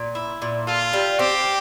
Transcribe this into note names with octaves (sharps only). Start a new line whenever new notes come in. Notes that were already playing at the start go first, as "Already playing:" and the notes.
Already playing: A#2
E4
A#2
F4 A4
G3
C4 G4